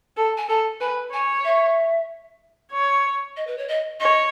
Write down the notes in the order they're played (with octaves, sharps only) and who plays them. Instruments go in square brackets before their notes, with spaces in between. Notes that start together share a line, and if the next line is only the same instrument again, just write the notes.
[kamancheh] A4 [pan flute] A5
[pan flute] G#5
[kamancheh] A4 [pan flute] A5
[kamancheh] B4 [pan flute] G#5
[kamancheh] C#5 [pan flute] G#5
[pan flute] E5
[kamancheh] C#5
[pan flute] D#5
B4
C#5
D#5
[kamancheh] C#5 [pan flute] D#5